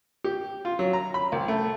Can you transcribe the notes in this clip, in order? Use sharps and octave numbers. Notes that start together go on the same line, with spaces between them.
G4
F4
F#3
A#5
B5
C2
A3